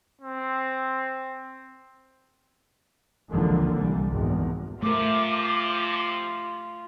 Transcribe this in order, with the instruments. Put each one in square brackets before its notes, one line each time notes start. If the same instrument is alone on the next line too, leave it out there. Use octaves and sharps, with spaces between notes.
[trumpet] C4
[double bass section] G#1 C#2 D3 E3 F3 A#3
C2 G3
G#1 E2
[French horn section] C3 F3 [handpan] A3 A#4 [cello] F4 [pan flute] D6